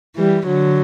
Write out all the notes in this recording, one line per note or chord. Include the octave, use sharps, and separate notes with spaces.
E3 G3
D3 F#3